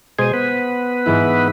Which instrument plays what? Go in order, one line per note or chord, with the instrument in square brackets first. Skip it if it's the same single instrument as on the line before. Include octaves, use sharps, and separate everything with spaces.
[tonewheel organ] B2 G#3 G#4 [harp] C5 D#7
[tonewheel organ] B3 B4
[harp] G#2 E3 E4